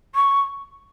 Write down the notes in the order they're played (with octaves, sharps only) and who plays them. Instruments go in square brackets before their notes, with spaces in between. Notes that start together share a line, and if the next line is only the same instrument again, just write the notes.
[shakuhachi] C#6